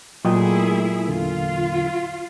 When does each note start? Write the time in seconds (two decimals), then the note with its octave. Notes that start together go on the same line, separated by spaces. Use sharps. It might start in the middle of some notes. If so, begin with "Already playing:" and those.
0.25 A#2 F#3 A3 E4 G#4 D#5 G5
1.08 E2 D3 F4